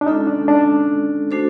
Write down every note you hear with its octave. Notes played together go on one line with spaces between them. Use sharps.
D4
G#3 C#4 D#4 F4 A4
D4
D4
A3 D4 F#4 A4 C5